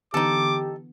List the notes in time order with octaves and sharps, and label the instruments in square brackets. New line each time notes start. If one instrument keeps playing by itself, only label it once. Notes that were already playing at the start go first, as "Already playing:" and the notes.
[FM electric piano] D3 E3 B3 [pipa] D#4 A4 [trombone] G4 [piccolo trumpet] D6